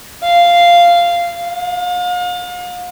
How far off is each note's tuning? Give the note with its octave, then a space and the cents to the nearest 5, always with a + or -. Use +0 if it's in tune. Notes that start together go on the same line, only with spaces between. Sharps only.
F5 -10
F5 +40